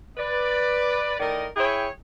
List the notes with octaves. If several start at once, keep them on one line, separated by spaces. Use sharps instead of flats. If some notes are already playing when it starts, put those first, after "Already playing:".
B4 D5
A2 D#3 A#4 D5 D#5
E4 G#4 C#5 G5